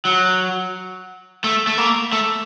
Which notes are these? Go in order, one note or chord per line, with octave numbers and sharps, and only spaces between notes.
F#3
A3
A3
A#3
A3